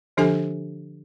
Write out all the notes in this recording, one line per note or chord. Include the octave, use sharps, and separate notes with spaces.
D3 F3 D4 G4 A4 G#5